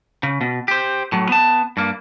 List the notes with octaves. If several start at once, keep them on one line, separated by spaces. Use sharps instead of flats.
C#3
B2
G4 C5
A2 F#3
B3 A5
G2 A#3